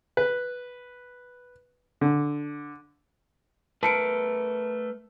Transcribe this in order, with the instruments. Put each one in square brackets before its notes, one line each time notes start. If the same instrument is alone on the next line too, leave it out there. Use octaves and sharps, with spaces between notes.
[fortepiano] B4
D3
[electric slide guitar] A3 A#4 B4 [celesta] A5 C#7 D7